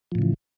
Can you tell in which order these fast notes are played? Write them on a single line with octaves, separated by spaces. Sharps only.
F3 A2 C#3 E3